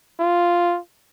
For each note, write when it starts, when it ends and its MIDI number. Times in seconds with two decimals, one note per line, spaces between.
0.19 0.78 65